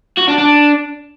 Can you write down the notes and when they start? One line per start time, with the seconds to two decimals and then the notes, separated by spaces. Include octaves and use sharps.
0.17 F#4
0.28 D4
0.38 D4